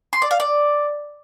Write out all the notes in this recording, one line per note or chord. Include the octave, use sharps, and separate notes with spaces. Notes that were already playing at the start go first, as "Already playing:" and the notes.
C6
D5
F5
D5